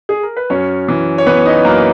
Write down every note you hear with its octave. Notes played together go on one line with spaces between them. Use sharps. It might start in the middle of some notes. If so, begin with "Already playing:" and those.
G#4
A#4
B4
F#2 C#4 C#5
E3
C#5
E3 B3 B4
D#4 D#5
F#2 A#3 A#4